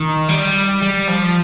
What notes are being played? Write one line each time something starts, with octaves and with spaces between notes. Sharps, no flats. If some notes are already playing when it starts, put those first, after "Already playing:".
Already playing: D#3
G3
G3
F3